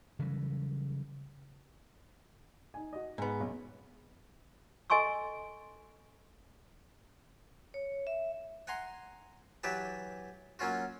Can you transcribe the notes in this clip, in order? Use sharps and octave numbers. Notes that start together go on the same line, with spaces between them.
C#3 E3 F#3 G3
D#4 G#5
F#4 D#5
G#2 B3
B1 F#2
A4 D#5 G#5 C6 C#6 E6
C#5
E5
F#5 G#5 A#5 C6
E3 F#3 G4 B4 A5
F#3 A#3 C#4 F4 F#4